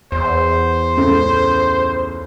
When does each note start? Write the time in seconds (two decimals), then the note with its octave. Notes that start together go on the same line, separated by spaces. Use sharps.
0.12 E2 C5
0.97 C#2 A2 C#3